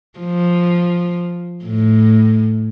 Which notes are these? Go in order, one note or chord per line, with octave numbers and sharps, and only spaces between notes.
F3
A2